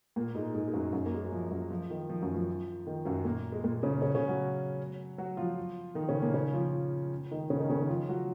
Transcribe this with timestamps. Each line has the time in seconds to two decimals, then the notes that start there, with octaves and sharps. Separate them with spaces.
0.16 A#2 A#3
0.35 G#2 G#3
0.54 G#2 G#3
0.68 G#3
0.73 F#2 F#3
0.93 F#2 F#3
1.06 A#3
1.14 G#3
1.23 F#3
1.32 F3
1.51 F#2 F#3
1.71 F3
1.90 D#3
2.10 F3
2.21 F#2 F#3
2.34 F3
2.87 D#3
3.05 F#2 F#3
3.25 A#2 A#3
3.52 G#3
3.64 A#2 A#3
3.83 C#3 C#4
4.02 C#3 C#4
4.15 C#3 C#4
4.28 F#3 F#4
5.18 F#3 F#4
5.37 F3 F4
5.95 D#3 D#4
6.09 C#3 C#4
6.22 A#2 A#3
6.34 C#3 C#4
6.54 F3 F4
7.31 D#3 D#4
7.50 C#3 C#4
7.59 D#3 D#4
7.70 C#3 C#4
7.79 D#3 D#4
7.89 F3 F4
8.09 F#3 F#4